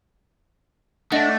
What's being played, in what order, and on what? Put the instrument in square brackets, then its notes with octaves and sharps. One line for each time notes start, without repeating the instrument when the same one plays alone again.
[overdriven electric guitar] A3 [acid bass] D4 [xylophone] D#5 F#5